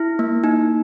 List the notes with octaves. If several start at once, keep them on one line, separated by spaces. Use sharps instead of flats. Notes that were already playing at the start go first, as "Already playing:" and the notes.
Already playing: E4
A#3
D#4